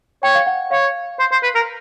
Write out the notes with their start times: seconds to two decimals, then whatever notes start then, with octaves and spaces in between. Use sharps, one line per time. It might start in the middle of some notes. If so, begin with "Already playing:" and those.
0.23 C#5 G5
0.35 F5
0.47 F#5
0.71 C#5 F5
1.19 C5
1.31 C5
1.43 B4
1.55 A#4